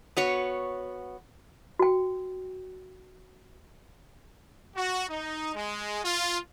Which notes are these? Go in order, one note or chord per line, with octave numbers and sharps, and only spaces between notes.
B3 F#4 C#5
F#4 G5
F#4
D#4
G#3
F4